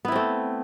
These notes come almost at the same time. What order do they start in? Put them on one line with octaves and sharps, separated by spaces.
B3 E4 C4 A3